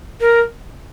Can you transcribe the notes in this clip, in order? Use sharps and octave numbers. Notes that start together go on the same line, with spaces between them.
A#4